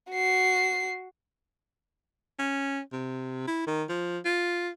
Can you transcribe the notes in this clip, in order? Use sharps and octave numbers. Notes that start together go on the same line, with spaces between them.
F#4 C7
C#4
C3
E4
D#3
F3
F4